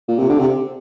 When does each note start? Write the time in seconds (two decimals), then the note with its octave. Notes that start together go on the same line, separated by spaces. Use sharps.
0.09 A#2
0.19 C3
0.29 D3
0.39 C3